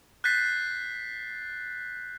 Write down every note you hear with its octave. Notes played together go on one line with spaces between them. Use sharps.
F#6 G6 A6 B6 C7